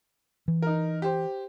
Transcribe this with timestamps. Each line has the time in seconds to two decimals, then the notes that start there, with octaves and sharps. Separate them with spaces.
0.48 E3
0.62 D#4 A#4
1.02 G4 C5